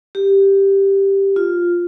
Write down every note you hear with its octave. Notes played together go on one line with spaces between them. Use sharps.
G4
F4